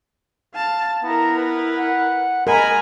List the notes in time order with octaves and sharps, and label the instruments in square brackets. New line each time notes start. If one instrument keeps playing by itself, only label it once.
[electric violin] F5 A5
[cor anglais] B3 [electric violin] E4 A#4 [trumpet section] A#5
[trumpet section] B4
[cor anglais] F#5
[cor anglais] G#3 [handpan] A#4 [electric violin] G#5 A#5 [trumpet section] B5